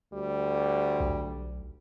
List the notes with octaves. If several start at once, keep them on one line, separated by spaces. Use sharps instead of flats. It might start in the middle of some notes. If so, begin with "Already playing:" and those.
D2 G3
B1